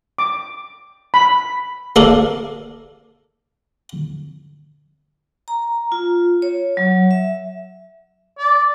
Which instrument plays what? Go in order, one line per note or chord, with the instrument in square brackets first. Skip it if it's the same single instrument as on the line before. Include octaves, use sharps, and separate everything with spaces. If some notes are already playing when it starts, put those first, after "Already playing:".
[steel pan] D6
B5
[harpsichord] A#3 A4 A#4 D5 F5
[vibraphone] A#5
F4
C#5
F#3
E5
[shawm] D5